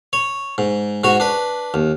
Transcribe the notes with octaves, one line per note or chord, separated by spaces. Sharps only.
C#5
G#2
G#2 F#4 C#5
D4 B4
D#2